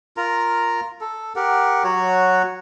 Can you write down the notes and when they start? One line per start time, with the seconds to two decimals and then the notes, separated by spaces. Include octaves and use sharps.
0.17 F4 A#4 A#5
1.01 A4
1.36 G4 A#4 F#5
1.84 F#3 F#4 C#5 F#5